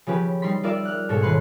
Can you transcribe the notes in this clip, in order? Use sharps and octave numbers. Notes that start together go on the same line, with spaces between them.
C#3 F3 C#4 G4 B4
G3 D#4 C6 B6
F4 A#4 D5 E5 F5
F6 F#6
G#2 B2 A4 C#5
D#1 B4 C6 F#6 C#7